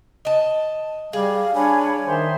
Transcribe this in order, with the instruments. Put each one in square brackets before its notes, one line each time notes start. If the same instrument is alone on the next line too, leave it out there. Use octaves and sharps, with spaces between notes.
[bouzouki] D#5 A5
[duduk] G3 [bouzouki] G#4 [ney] F5
[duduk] D4 [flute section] C#5 B5 [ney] G#5
[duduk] D#3 [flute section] C5 E5 C6